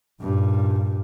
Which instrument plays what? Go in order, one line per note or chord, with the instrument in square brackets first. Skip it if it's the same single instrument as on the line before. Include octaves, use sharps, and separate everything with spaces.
[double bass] G2 A#2